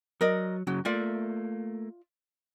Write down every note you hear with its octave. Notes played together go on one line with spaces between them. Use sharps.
F#3 A#4 D5 D#5
F#2 C#3 F#3 F#4
A3 A#3 F4 D5 E5